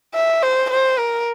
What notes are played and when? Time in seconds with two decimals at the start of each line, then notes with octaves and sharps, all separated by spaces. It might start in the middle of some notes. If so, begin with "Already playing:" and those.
0.14 E5
0.43 C5
0.70 C5
0.99 A#4